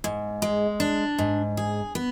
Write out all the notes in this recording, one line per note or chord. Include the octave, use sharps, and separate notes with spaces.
G#2
G#3
D4
G#2
G#4
B3